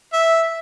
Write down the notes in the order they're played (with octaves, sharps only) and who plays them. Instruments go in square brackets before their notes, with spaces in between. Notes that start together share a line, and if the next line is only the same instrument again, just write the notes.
[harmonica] E5